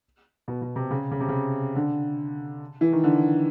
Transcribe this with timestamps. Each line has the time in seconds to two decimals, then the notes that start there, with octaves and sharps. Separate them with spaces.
0.48 B2
0.62 B2
0.76 C3
0.91 C#3
1.11 C#3
1.20 C3
1.28 C#3
1.76 D3
2.81 E3
2.93 D#3
3.04 D3